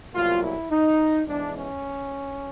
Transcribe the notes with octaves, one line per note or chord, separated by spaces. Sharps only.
C2 B2 F#3 A#3 F4
E4
D#4
G#2 E3 G#3 B3 D4
C#4